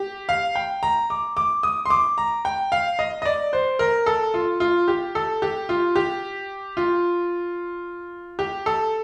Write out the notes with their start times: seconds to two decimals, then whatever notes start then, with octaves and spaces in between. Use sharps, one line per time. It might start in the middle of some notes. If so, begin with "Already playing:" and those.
Already playing: G4
0.29 F5
0.55 G5
0.83 A#5
1.10 D6
1.37 D6
1.63 D#6
1.86 C6
1.90 D6
2.18 A#5
2.45 G5
2.72 F5
2.99 D#5
3.22 D#5
3.25 D5
3.53 C5
3.79 A#4
4.06 A4
4.34 F4
4.60 F4
4.88 G4
5.15 A4
5.42 G4
5.69 F4
5.96 G4
6.77 F4
8.39 G4
8.66 A4